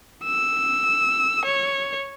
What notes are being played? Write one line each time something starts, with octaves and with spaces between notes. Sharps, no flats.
E6
C#5